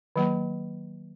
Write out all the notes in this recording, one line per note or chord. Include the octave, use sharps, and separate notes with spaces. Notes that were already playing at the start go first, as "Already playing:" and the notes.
D#3 F#3 A#3